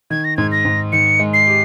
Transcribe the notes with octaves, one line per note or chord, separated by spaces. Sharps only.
D#3 G#6
A#6
G#2 G#6
A#6
G#2
D#3 C#7
G#3
C7
G4